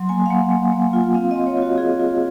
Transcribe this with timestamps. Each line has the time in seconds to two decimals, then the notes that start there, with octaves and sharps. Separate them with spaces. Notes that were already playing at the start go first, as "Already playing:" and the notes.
Already playing: F#3 C6
0.09 A#3 G#5
0.26 F5
0.30 A#3 F#5
0.51 A#3
0.72 A#3
0.93 F4
1.14 C4 F5
1.31 C4 D#5
1.47 C#5
1.57 F4
1.62 F#4
1.78 F4 G#4
2.00 F4